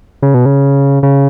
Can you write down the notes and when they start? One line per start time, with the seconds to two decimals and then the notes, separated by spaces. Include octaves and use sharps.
0.22 C#3
0.34 B2
0.46 C#3
1.03 C#3